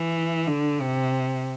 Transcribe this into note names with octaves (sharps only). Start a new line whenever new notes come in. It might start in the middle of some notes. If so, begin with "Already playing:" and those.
Already playing: E3
D3
C3